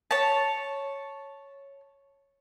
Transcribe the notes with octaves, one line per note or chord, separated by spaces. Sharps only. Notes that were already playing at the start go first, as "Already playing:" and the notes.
C#5 A5